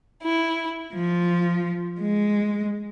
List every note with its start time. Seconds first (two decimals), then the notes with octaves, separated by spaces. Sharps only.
0.23 E4
0.94 F3
2.01 G#3